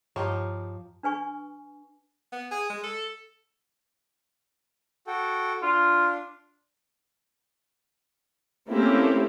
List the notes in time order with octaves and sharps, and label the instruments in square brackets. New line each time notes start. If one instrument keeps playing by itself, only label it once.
[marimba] G2 [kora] F3 [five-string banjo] D#4 G4 C#5
[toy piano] D4 B4 G#5 C#6
[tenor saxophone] B3
G#4
G#3
A4
[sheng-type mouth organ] F#4 A4 G5
[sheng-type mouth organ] D4 [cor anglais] F4
[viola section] A3 A#3 C4 C#4 E4 G4